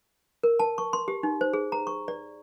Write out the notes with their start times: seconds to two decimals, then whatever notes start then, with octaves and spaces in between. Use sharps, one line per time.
0.43 A#4
0.60 A5
0.78 C#6
0.93 C6
1.08 G4
1.23 D#4
1.41 C5
1.53 G#4
1.72 A#5
1.87 C#6
2.08 D5